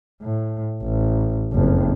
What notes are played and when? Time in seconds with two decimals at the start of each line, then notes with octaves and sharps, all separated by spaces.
0.23 A2
0.82 A1
1.53 F#1 F2